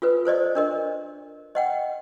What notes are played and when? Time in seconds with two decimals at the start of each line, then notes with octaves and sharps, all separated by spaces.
0.02 F4 A4 B4
0.25 A4 C5 D5 D#5
0.55 D4 A#4 D#5
1.55 D#5 F#5 G5